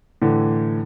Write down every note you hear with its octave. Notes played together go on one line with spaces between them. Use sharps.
A2 D3 E3